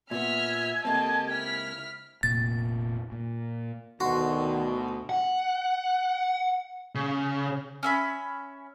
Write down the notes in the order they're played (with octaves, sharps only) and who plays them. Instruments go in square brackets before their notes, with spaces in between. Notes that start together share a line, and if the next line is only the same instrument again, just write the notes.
[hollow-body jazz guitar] A#2 B3 [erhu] E5 [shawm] G#5 [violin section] F6 B6
[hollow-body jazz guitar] C#2 A#3 C4 [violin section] G4 A4 D#5 [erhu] A5
[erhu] E4 [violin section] F6 B6
[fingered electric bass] F1 A#2 A#3 [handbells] A6
[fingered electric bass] A#2
[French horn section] D2 B2 [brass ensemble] D#3 [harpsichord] F#4 [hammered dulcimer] C6
[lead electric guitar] F#5
C#3
[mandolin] C#4 E5 B5